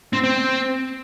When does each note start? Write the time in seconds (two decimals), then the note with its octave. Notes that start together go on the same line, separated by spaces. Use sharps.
0.13 C4
0.24 C4